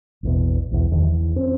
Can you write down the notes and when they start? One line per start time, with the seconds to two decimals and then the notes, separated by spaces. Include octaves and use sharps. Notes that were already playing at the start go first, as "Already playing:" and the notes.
0.23 A1 E2 B2
0.72 B1 E2
0.92 F#1 E2 D#3 F3
1.07 E2
1.36 F2 C4 C#4